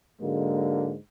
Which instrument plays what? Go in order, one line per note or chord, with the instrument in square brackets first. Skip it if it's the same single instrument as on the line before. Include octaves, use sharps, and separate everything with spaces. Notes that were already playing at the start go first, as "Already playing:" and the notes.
[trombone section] G#2 D3 F#3 G#3 A#3